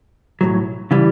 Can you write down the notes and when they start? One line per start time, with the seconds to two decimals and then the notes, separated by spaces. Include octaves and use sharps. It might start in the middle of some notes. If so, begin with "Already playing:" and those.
0.41 B1 A2 F#3
0.91 C#3 E3 G3